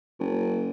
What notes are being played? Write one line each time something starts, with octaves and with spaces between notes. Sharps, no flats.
F#1